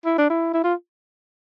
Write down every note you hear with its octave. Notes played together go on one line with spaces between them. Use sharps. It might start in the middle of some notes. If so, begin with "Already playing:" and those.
E4
D4
E4
E4
F4